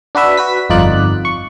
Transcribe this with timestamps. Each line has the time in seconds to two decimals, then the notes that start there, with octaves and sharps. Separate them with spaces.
0.15 D4 F#4 B4 E5
0.37 F#4 B4 B6
0.69 G1 F2 D#4 F4 D5 F#6
1.25 C#6